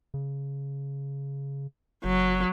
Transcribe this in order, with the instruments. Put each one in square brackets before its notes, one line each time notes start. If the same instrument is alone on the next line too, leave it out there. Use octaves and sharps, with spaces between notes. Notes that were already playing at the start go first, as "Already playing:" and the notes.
[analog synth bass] C#3
[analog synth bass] F#1 [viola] F#3